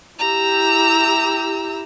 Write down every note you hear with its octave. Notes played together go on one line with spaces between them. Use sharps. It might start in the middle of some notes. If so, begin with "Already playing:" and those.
E4 G4 A#5 E6